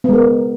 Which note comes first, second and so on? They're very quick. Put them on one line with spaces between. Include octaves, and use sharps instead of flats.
B3 G#3 A#4